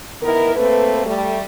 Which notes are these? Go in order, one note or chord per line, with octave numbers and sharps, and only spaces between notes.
D#3 B3 E4 A#4
A3 A#3 C4 A4 B4
G3 A3